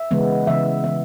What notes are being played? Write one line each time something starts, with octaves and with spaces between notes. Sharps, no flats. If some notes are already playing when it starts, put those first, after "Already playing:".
Already playing: E5
C#3 E3 G#3 B3
C#3 E3 B3 E5
E3 B3 E5